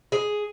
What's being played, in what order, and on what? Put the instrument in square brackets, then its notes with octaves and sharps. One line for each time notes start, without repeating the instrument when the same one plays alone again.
[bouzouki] G#4